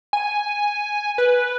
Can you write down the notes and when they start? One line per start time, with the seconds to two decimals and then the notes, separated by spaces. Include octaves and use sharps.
0.13 G#5
1.18 B4